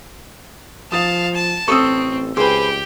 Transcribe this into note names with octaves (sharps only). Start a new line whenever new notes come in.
F3 F5 A5 D#6 A6
A5
A1 C4 A4 C#6 D#6 E6
C#2 G4 G#4 B4 C5 G5